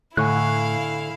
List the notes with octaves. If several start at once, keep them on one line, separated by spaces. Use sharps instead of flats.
A2 D3 E4 F5 G#5 C#6 F#6